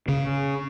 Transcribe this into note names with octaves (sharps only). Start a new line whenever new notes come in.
C#3